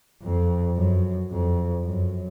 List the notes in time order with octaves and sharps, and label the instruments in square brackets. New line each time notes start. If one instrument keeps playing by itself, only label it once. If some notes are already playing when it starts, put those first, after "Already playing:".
[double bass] F2
F#2
F2
F#2